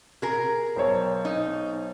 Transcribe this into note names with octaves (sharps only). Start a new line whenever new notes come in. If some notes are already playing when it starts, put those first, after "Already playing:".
G#4 A#4
B1 C5 C#5
D#4